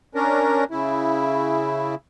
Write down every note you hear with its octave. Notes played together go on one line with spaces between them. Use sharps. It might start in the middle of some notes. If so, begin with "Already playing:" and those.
C#4 D4 A#4
C#3 E4